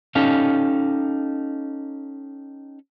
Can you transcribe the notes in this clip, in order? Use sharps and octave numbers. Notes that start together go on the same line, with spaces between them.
C#4 D#4 G4 A4 F5